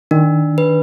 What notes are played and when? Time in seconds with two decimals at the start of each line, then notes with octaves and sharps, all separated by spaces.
0.11 D#3 D4
0.58 B4